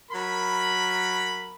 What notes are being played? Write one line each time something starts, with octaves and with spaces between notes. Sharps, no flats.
F#3 A#4 B5